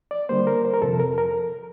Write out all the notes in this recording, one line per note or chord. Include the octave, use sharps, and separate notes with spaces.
D5
D3 G3 A#3 C5
A#4
C5
A#4
F2 C3 F3 A4
A#4
A#4